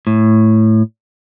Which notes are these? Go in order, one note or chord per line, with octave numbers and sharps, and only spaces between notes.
A2